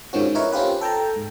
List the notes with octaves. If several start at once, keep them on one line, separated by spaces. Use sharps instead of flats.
G#2 D#3 F3 C#4 F#4
D#4 E4 A#4 B4 C#5
C4 C#4 F4 G4 B4
A4 G5 A5 A#5
G#2